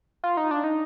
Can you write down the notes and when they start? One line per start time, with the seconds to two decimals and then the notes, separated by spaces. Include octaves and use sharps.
0.24 F4
0.37 D#4
0.51 D4
0.64 D#4